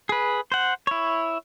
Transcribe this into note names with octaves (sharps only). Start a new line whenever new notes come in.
G#4 B4
C5 F#5
E4 C#5